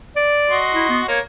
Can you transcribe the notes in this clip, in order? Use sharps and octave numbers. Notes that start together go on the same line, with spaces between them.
D5
F#4 D#5 C6
E4
B3
A#3 C#5